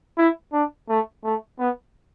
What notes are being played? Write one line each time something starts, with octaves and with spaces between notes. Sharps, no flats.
E4
D4
A3
A3
B3